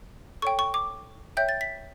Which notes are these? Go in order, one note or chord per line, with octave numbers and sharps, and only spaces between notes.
A4 C#5 G5 C#6
C#6
D6
C#5 E5 G5 G6
A6
B6